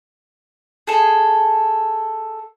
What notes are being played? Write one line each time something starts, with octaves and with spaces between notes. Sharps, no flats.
G#4 A4